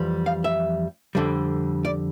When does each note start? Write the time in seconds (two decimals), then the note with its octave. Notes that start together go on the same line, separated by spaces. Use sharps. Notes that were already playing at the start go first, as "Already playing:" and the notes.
Already playing: F2 E3 G3
0.26 F5
0.44 E5
1.15 F2 D3 G3
1.85 D5